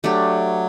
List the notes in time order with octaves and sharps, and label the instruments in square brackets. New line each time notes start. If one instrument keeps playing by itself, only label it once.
[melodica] F#3 [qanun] A3 D4 G4